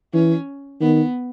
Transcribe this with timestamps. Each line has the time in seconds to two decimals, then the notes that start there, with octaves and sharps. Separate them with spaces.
0.14 E3 C#4
0.81 D#3 B3